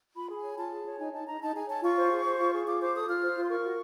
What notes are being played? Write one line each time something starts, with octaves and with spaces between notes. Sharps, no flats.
F4 B5
G#4
G#5
C#5
F4 A5
G#4
C#5
D#4 G#5
D#4 A5
D#4 A#5
D#4 A5
G#4 G#5
C#5 A5
F4 C#6
C5
G#4
C5
F4
G#4
F4 D6
C5 D6
A4 D#6
F4 F6
C5
F4
C6
A#4 C#6
F#4